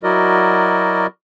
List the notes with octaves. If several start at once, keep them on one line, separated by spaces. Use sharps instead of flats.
F#3 E4 F#4 A#4 D5 D#5